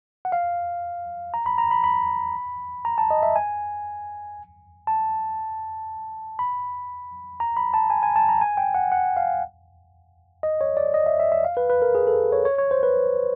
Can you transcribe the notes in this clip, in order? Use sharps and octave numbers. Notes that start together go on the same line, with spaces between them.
F#5
F5
A#5
B5
A#5
B5
B5
A#5
A5
D#5
E5
G#5
A5
B5
A#5
B5
A5
G#5
G#5
A5
A#5
G#5
G5
F#5
F#5
F5
D#5
C#5
D5
D#5
E5
E5
E5
F5
B4
B4
A#4
G#4
A4
C#5
C#5
C#5
C5
B4